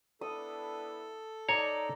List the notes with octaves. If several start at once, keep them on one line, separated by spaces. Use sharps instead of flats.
B3 D4 E4 A4 D#6
D#4 C#5 D5 A#5